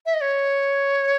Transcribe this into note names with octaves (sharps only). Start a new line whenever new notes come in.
E5
D#5
C#5